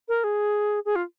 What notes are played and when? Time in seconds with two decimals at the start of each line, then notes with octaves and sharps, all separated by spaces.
0.08 A#4
0.24 G#4
0.85 G#4
0.95 F4